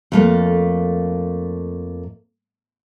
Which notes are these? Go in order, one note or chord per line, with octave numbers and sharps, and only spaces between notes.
F2 A3 A#3